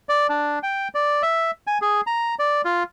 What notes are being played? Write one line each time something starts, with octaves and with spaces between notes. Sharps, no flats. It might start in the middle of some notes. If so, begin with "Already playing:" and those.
D5
D4
G5
D5
E5
G#5
G#4
A#5
D5
F4